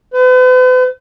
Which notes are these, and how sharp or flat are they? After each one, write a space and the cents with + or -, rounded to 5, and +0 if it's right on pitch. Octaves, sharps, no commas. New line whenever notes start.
B4 +45